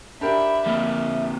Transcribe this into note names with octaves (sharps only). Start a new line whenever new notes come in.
D4 G4 A#4 E5 B5
F2 A#3
E5